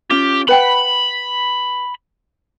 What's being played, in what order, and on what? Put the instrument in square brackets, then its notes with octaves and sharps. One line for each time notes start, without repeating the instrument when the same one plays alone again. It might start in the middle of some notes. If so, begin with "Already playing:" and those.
[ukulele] C#4 F4 [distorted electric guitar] G4
[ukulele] B4 F#5 G5 [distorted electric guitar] B5